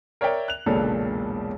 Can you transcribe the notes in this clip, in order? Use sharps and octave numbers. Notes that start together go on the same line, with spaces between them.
A#4 C#5 D5 E5 G5 A#5
F#6 F7
E1 B1 A#2 C#3 D4 A4